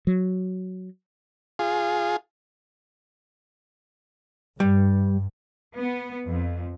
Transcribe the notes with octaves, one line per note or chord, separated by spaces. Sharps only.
F#3
F4 G#4
G2 G3
B3
F2